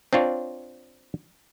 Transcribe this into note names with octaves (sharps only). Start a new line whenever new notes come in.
C4 D4 F4 C#5